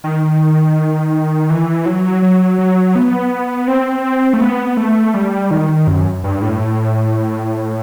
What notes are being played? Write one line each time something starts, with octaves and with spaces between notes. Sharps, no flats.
D#3
E3
F#3
F#3
F#3
B3
C4
A3
B3
A3
G3
D#3
F#2
G2
A2